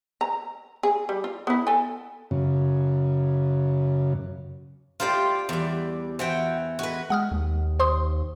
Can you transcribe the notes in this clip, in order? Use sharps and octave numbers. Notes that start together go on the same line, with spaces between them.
A#5
G#4
G3
F4
B3 E4
A4 G#5
F#2 C#3
A#3 E4 F4 G4 C5 D5
E2 G3 D5
E3 F#4 C5 G5
G#3 F#4 B4
G#3 F#5 D#6 F6
D#2
C5 C6 D#6